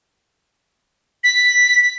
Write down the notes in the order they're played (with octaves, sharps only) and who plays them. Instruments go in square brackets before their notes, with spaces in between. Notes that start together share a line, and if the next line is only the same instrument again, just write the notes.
[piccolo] B6